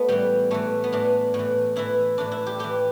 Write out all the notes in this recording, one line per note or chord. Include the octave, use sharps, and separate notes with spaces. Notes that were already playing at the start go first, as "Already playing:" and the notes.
Already playing: A3 B3
A2 E3 G3
A2 E3 A3
B3
A2 E3 D4
A2 E3
A2 E3 E4
A2 E3 D4
E4
G4
A2 E3 G4